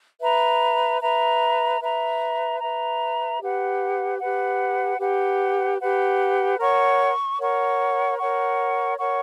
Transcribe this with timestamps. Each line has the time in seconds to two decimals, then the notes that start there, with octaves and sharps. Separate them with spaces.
0.21 B4 E5 A#5
1.01 B4 E5 A#5
1.81 B4 E5 A#5
2.60 B4 E5 A#5
3.40 G4 B4 F#5
4.20 G4 B4 F#5
4.99 G4 B4 F#5
5.79 G4 B4 F#5
6.59 A#4 C#5 F#5 C#6
7.39 A#4 C#5 F#5 C#6
8.18 A#4 C#5 F#5 C#6
8.99 A#4 C#5 F#5 C#6